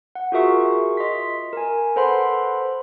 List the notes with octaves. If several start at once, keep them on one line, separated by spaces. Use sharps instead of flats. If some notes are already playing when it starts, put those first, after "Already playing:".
F#5
F4 F#4 G#4 A#4 E5 C#6
D#5 C6 B6
A#4 G#5
A4 B4 C5 F#5 B5 C6